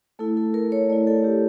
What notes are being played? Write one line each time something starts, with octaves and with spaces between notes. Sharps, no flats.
A3 E4 A4
A4
A#4
C#5
A3 E4 D5
A4
G4